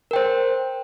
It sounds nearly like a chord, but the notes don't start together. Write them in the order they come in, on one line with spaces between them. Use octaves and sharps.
A#4 G5 C5